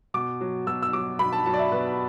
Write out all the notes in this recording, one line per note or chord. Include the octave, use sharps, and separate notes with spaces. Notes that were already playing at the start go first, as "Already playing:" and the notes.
B2 D6
F#3
B2 E6
E6
F#3 D6
B2 B5
A5
F#3 A5
D5
E5
B2 B4